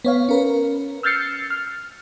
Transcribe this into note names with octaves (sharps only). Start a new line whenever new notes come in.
B3 C#5 F5
C#4 A#4 B4
E6 F6 G6 A6 C7 C#7
F6